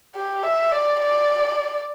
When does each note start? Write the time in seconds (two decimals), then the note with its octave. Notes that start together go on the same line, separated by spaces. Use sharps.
0.15 G4
0.43 E5
0.72 D5
1.00 D5